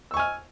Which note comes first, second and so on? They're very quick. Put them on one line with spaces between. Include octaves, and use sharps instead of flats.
E6 C#6 G#5 F6